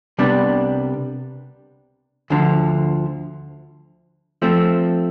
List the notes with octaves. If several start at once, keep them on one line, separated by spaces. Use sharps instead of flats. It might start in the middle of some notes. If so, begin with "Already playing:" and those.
C2 C3 G3 B3 D4
D2 D3 F3
F3 A3 C4